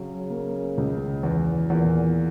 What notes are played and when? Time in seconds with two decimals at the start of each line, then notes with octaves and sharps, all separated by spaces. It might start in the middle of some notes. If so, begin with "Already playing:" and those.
Already playing: C#3 F#3
0.30 A#3
0.78 C#2
1.23 E2 B2
1.70 E2 A#2